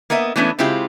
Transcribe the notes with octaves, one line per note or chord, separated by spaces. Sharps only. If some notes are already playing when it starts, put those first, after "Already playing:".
A#3 B3 A#4 D#5 E5
E3 G#3 A3 B3 C#4 D4
C#3 G#3 C4 E4 F4 G4